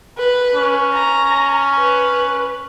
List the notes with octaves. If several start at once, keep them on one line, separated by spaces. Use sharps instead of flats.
B4
C#4
A#5
B4